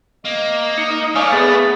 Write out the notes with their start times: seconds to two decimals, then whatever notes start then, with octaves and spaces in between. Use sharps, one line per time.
0.25 A#3 D#5
0.78 D#4 C#7
1.15 A3 C#5 D5 F5 G#5 D#6
1.32 B3 G#4 A6